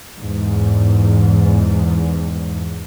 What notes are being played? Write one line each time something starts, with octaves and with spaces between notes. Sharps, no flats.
E2 G#2